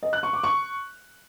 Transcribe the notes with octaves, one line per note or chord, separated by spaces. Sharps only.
D#5
F#6
C#6
D6
C#6